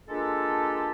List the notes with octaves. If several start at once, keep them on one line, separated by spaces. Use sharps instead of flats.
G#3 A#3 D4 F4 G4 A4